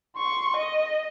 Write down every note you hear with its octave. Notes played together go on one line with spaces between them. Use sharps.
C6 C#6
D#5